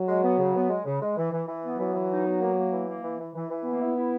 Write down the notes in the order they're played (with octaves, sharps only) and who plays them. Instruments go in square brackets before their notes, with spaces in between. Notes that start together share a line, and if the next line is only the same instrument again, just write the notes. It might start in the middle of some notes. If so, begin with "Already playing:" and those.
Already playing: [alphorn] F#3
[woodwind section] G#3
B3
C#3
B3
G#3
C#3
G#3
E3
E3
E3
B3
[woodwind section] E3 [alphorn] F#3
[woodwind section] E3
D#4
B3
A#3
A#3
E3
A#3
E3
E3
E3
E3
[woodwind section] A#3 [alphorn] B3
[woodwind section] E4
E4